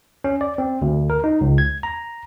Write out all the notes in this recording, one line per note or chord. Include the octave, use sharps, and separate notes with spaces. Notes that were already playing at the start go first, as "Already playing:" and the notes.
C#4
D5
C4
D2
A#4
D#4
C#2
G#6
A#5